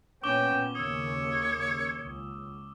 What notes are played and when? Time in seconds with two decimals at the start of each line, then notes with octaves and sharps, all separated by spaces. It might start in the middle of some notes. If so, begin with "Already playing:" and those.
0.23 A#2 B3 C#4 G5 C#6 D6 G7
0.75 D#2 C#3 A#3 C#5 D#6 E6
1.98 C#2